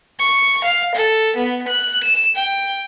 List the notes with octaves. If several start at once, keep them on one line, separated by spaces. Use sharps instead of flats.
C#6
F5
A4
B3
F#6
E7
G5